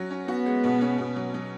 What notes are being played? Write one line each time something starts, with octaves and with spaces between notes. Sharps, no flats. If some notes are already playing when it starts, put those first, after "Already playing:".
Already playing: F#3 C#4 F#4
C#4
B3 F#4
G#3
B2
C#4
B2
F#3
F#3